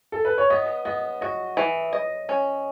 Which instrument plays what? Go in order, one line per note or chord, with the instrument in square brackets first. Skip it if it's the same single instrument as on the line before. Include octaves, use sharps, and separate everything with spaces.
[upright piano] A4
B4
C#5
[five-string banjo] B3 [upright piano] D#5
[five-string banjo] B3 [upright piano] D#5
[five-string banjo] F#4 [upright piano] D#5
[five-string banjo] E3
D#5
C#4